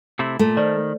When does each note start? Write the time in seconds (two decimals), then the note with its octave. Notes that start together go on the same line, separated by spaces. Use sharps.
0.19 C3 A3 E4
0.39 A#2 A3
0.57 D#3 C5 D5